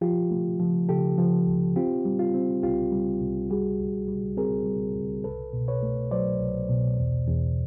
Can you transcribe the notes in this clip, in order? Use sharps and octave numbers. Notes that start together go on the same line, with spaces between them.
F3 F4 G4
A3
F3
C#3 G4 A4
F3
C#2
C4 F4 G4
G3
F4
C4
C2 F4 G4
G3
C2
G3 F#4 G#4
C#2
G3
C4 G#4 A#4
G3
C#2
C2 A4 B4
B2
B4 C#5
A3
F#3 C5 D5
C2
B2
E2
E2